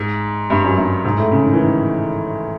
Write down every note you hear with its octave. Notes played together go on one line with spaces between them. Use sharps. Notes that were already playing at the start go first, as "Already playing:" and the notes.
Already playing: G#2
G2
F#2
G2
G#2
A2
C#3
D#3
E3
D#3